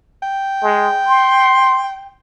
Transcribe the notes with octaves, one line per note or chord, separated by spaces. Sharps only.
G5
G#3
C6